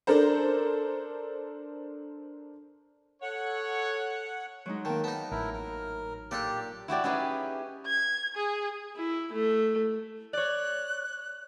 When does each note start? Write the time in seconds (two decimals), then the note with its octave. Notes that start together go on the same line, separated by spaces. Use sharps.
0.07 D4 A4 A#4 C5
3.22 A4 C#5 F#5
4.66 F#3 G#3 D#4
4.85 D#3 A#3 A5
5.04 B3 D#4 A5
5.31 A1 E4 A#4
5.54 A#4
6.31 A#2 D4 G4 A4 D5
6.88 E4 F#4 G4 D5
7.04 C#4 D#4 E4 G4 G#4 B4
7.87 G#6
8.36 G#4
8.96 E4
9.33 A3
10.33 C#5 D5 F#6